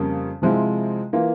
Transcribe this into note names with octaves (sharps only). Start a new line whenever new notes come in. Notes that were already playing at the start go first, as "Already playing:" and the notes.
Already playing: F2 C#3 G3 A#3 C#4
C3 F3 G#3 C4 E4
E3 A#3 F4